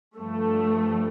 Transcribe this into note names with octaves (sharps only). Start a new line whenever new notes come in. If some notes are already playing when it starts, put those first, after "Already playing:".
G2 F3 A3